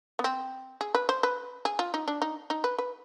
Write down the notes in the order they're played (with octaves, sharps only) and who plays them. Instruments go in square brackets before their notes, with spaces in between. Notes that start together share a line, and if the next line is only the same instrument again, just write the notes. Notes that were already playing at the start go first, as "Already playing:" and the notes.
[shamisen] B3
C4
G#4
B4
C5
B4
G#4
F4
D#4
D4
D#4
D#4
B4
B4